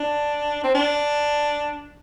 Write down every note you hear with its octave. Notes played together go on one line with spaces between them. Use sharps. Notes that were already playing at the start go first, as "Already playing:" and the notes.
Already playing: D4
C4
D4